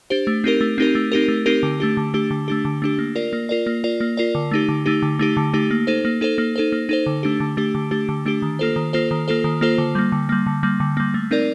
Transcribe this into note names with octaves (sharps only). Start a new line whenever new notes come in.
D4 G4 C5
A3
C4 D#4 G4 A#4
A3
C4 D#4 G4 A#4
A3
C4 D#4 G4 A#4
A3
C4 D#4 G4 A#4
D3
A3 D4 G4
D3
A3 D4 G4
D3
A3 D4 G4
D3
A3 D4 G4
A#3
F4 A#4 D5
A#3
F4 A#4 D5
A#3
F4 A#4 D5
A#3
F4 A#4 D5
D3
A3 D#4 G4
D3
A3 D#4 G4
D3
A3 D#4 G4
D3
A3 D#4 G4
A#3
D#4 A4 C5
A#3
D#4 A4 C5
A#3
D#4 A4 C5
A#3
D#4 A4 C5
D3
A3 D4 G4
D3
A3 D4 G4
D3
A3 D4 G4
D3
A3 D4 G4
D#3
A#3 F4 A4 C5
D#3
A#3 F4 A4 C5
D#3
A#3 F4 A4 C5
D#3
A#3 F4 A4 C5
D3
G3 A#3
D3
G3 A#3
D3
G3 A#3
D3
G3 A#3
A3
C4 D#4 A#4 D5